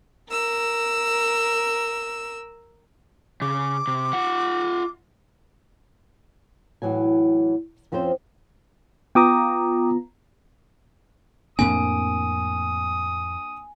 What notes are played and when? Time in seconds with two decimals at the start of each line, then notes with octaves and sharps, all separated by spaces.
0.28 A#4 E6
3.42 C#3 D6
3.87 C3
4.13 F4 F#5
6.82 A2 E3 F#3 G#5
7.92 F2 F3 C4 C#4 C5
9.15 B3 F4 G5 A#5 D6 D#6
11.59 F2 A2 A#3 C4 D4 G#5 D#6